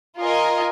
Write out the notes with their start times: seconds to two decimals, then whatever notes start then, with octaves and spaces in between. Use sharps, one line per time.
0.18 F4 A#4 D#5 G#5